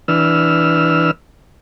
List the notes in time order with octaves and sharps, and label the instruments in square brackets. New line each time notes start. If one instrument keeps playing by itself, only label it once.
[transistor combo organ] E3 D4 B4 E6 F6